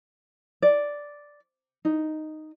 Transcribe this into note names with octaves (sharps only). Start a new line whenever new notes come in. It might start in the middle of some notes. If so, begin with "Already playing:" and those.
D5
D#4